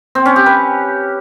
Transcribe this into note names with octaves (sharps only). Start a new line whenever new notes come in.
C4
C#4
G4
B4